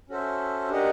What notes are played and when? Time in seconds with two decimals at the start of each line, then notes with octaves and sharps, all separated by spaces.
0.09 C#4 F#4 A4 C5 E5
0.69 D4 G4 A#4 D#5 F#5